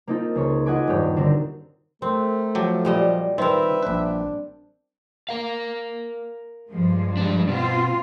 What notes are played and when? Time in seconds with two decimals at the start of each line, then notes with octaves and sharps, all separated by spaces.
0.07 A#3 C4 D#4 F4 A4
0.35 C#2 G#4 C#5 C#6
0.66 F4 D#5 F#5 G#5 B5 D6
0.87 D#1 G2 D4 G4 C#5 G6
1.16 D3 C4 D4 D#4 F#4 A#4
2.02 A3 C4 A#4
2.55 F3 F#3 G4 A4
2.85 A#2 G3 D#5
3.38 D#3 C4 A#4 B4 E5
3.83 A#1 D4 B4
5.29 A#4 F5
6.68 G2 F3 G#3
7.17 G3 D4
7.49 B2 C4 F4